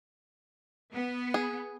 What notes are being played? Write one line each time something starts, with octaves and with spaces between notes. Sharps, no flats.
B3
G#4